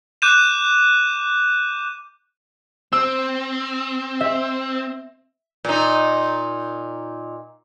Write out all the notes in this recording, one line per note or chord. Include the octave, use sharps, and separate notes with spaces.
D6 F#6 G6 D#7 E7
C4 E6
E5
A#2 D#4